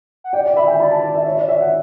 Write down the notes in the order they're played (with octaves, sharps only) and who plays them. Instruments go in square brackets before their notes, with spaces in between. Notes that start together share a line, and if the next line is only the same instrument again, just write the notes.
[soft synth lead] F#5
[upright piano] D5 [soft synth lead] G5
[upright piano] D5
[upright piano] E5 [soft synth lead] B5
[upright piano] G5
[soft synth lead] D5 [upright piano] B5
[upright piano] A5
E5
C#5
D5
E5
F#5